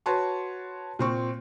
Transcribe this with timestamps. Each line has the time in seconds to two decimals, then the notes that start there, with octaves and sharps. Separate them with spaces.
0.06 F#4 B4 C#5 A5 C6
0.99 A#2 C4 C#6